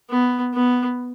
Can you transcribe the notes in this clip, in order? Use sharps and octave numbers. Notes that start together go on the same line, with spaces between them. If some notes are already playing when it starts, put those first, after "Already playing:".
B3
B3